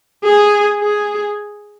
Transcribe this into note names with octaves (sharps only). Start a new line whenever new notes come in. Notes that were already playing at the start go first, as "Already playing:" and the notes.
G#4
G#4